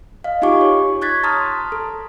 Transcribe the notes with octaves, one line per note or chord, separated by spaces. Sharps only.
D#5 F5
D#4 F4 G4 G#5 C#6 D6
C#5
C#6 F#6 G#6 A6 B6
A5 A#5 C6 D#6 F6
A4